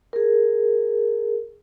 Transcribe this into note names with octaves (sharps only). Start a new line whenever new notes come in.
G#4 A#4